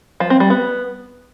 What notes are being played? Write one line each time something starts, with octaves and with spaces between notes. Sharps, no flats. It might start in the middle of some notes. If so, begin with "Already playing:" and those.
F3
C4
G3
B3